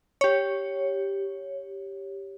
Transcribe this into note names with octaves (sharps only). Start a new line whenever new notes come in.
G4 C#5